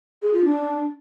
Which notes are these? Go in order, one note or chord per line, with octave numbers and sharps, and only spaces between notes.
G#4
F4
D4